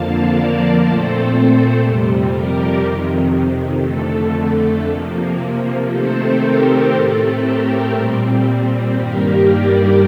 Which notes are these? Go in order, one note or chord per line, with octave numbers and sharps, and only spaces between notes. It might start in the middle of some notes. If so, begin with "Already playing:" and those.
Already playing: F2 D3 F3 A#3 F5 A5
A#4 D5
A#2 A3 C4 A4 C5
F2 C3 G3
G4 A#4
F2 C3 D#3
F2 D3 A3 A4
C3 F3 A#3
C3 D#3 A3 C4 A4 C5
G4 A#4
A2 A3 C4 A4
G4 A#4
A#2 G3 C4
G2 D#3 G3 A#3 G4 A#4
A#4 D5